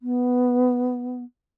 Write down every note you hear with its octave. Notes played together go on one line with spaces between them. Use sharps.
B3